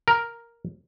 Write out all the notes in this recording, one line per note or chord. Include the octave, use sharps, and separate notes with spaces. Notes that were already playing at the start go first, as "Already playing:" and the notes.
A#4